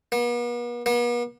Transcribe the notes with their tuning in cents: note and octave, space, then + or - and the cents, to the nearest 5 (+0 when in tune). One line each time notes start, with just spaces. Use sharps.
B3 -45
B3 -45